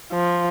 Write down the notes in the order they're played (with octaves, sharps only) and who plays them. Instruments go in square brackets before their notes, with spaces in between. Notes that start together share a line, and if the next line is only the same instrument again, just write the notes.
[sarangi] F3